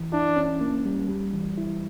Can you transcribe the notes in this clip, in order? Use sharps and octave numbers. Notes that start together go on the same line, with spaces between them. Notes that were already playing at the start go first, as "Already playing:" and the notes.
Already playing: E3
D4 E4
C#4
A#3
G3
G3
E3
E4